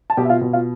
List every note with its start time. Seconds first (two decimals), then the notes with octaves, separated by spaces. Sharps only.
0.10 A5
0.17 B2 G4 G5
0.25 E5
0.29 F4 F5
0.41 B2
0.53 F4 F5